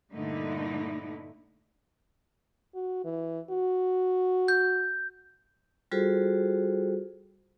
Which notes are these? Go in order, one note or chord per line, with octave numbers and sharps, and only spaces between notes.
G2 A#2 D3 A3 D#4 E4
F#4
E3
F#4
G6
G3 F4 F#4 G#4 A4 C5